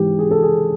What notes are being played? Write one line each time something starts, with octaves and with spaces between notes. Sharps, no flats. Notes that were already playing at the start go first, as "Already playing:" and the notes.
Already playing: G#2 E3 G4
G#4
A4
G#4